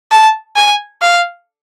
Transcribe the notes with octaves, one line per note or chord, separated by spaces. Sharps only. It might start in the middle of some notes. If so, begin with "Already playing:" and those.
A5
G#5
F5